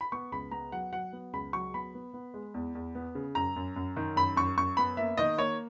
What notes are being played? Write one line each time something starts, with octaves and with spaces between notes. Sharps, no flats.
B5
B3 C#6
C#2 B5
B3 A#5
F#3 F#5
F#3 F#5
B3
C#2 B5
F#3 C#6
B3 B5
B3
B3
G#3
E2
E2
B3
C#3
F#2 A#5
F#2
F#2
D#3
F#2 B5
F#2 C#6
F#2 C#6
B3 B5
A#3 E5
D#3 D#5
A#3 C#5